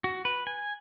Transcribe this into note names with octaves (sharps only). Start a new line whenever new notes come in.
F#4
B4
G#5